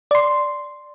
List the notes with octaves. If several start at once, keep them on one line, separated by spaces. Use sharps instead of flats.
D5 C6